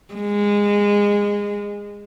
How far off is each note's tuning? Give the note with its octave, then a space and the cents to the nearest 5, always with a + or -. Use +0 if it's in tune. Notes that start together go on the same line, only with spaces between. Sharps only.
G#3 -20